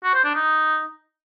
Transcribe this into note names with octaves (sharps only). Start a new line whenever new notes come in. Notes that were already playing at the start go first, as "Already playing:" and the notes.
F#4
C5
D4
D#4